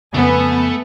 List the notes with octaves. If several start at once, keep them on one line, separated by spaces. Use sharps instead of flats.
F2 C#3 A3 B3 G#5 A5